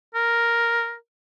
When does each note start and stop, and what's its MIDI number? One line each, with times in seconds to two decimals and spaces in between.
0.15 0.95 70